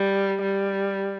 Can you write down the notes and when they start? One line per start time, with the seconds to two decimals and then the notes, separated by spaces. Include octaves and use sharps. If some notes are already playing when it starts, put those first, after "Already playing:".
Already playing: G3
0.42 G3